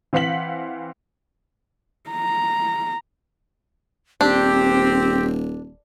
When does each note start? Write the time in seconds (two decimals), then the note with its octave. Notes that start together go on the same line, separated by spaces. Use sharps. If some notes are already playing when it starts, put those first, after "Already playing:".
0.13 E3 C4 F5 F#5 B6 F#7
2.10 A#5
4.21 D#1 C4 D4 G4